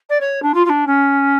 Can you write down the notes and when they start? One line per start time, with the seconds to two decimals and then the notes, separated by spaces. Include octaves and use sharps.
0.09 D5
0.20 C#5
0.42 D4
0.54 F4
0.65 F4
0.69 D4
0.87 C#4